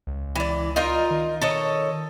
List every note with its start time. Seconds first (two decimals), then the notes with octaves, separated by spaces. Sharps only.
0.07 C#2
0.35 E3 D5
0.76 D#4 F4 A#4
1.11 D#3
1.42 A4 C#5 D#5